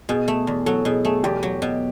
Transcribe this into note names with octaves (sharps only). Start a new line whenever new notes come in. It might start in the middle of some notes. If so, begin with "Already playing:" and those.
B2 G#4
A3
E2
F#3 A4
B2 G#4
A3 G#4
E2 G4
F#3
B2